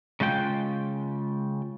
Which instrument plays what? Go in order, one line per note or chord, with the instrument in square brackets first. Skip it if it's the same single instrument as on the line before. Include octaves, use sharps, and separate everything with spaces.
[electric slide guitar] C#3 G#3 F4 G5